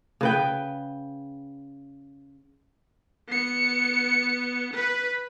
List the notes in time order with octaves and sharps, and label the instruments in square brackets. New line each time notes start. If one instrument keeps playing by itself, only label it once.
[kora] C#3 B4 G5
[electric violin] B3 C#7
B4 B5